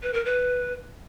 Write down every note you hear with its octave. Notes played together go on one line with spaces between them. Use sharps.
B4
A#4
B4